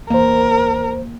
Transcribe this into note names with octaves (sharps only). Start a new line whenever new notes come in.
E2 A#3 A#4 C5